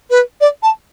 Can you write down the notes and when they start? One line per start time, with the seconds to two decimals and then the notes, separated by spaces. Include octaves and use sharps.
0.10 B4
0.41 D5
0.63 A5